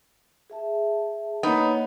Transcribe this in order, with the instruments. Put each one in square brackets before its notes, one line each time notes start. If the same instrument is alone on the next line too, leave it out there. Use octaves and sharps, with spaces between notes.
[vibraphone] G#4 E5 A5
[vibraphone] A#3 C#5 [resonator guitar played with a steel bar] B3 D#4